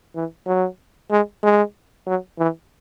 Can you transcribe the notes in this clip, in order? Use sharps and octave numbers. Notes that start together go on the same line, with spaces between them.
E3
F#3
G#3
G#3
F#3
E3